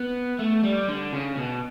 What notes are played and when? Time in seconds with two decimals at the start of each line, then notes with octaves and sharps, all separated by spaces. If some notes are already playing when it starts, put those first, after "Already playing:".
Already playing: B3
0.39 A3
0.63 G3
0.88 D3
1.13 C#3
1.37 B2